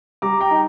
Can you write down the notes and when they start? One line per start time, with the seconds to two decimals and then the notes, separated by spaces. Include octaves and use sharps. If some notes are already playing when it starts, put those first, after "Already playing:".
0.22 G3 A#5 D6
0.41 G5 A#5
0.51 D#4